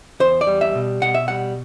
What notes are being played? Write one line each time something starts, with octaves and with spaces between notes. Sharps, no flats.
E2 C5
D5
G3
E5
B2
B2 F#5
E5
G3 F#5